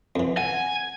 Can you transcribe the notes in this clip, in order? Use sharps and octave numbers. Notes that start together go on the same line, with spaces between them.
F2 E3
F#5 G#5